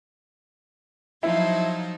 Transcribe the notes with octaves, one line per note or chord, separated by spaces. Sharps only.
F3 F#3 D#4 E4